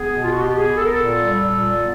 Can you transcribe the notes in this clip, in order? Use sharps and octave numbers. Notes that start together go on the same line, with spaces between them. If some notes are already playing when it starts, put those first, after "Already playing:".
Already playing: B3 G#4
B2
F4
F#4
B3 G4
G#4
B3
A4
A#4
A#2 A4
G3
A#2
B3